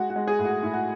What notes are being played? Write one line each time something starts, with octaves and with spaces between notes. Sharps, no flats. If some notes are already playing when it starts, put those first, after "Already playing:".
Already playing: G#3 F#4
F#4
G#3
G#4
A2
F#4
A2 E4
F#4